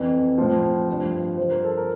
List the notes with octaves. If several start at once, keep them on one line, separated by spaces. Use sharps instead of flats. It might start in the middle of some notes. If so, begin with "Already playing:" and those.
Already playing: F2 E3
A2 F3
G2 F3
G2 F3 C5
A#4
A4
A#4